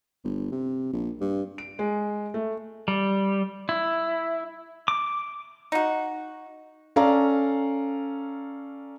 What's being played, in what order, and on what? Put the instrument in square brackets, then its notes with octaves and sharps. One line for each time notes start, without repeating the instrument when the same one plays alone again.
[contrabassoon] G1
C3
A#1
G2
[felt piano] D7
G#3
A3
[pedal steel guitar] G3
E4
D6
[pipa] D#4 F#4
[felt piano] C#4 A4 D5 F5 A#5